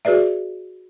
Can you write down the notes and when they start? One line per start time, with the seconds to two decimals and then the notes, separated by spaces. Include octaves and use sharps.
0.05 F#4 G#4 B4 D5 E5